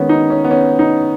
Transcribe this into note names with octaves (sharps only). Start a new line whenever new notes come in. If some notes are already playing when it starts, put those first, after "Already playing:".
Already playing: D#3 G#3 B3 C#4
D#4
C#4
B3
C#4
D#4